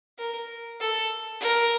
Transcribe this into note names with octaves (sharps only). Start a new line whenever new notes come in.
A#4
A4
A#4